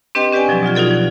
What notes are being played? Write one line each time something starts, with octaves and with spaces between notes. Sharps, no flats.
C4 D4 G4 B4 D#5 G5
C#4 G4 B4 D5 G5 G#5
B2 F3 F#3
B2 F#3 F4 G#6
D#4 F4 F#4 A4 D5
F3